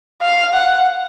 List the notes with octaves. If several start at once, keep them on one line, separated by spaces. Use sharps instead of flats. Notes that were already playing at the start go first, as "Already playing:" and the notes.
F5
F#5